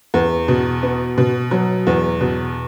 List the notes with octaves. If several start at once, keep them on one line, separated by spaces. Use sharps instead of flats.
E2
B2
B3
B2
F#3
E2
B2